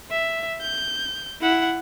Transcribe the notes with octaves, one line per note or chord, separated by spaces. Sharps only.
E5
G6
E4 F#5